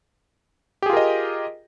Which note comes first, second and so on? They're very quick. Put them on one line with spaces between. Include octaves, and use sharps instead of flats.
G4 G#4 F4 A#4 D#5